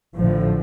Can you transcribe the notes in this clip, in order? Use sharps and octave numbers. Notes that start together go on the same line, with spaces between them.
A1 A2 D3 F3